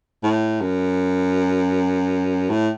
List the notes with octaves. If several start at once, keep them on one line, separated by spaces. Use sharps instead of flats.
A2
F#2
A2